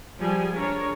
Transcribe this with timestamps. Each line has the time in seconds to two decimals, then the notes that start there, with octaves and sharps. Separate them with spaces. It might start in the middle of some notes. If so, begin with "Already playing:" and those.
0.20 F3 G3 G#4 G#5
0.54 D4 G#4 A#4 C#5